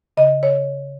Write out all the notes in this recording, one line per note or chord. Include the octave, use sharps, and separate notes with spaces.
C#3 D#5
C#3 C#5